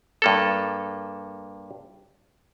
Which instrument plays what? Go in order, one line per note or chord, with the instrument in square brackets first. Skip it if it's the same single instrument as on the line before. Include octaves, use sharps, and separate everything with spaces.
[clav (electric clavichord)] G2 A#3 A4